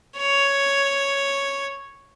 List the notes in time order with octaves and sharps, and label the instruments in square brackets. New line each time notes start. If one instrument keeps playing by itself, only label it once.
[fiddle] C#5